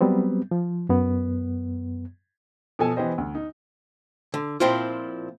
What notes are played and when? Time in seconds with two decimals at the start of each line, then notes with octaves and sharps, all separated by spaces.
0.01 F#3 G3 B3 C4
0.51 F3
0.89 F#2 B3
2.79 B2 F3 A4 G#5
2.96 E3 B3 G4 C5 D#5
3.18 D2
3.35 D#4
4.34 D3
4.60 A#2 F3 C4 E4 F4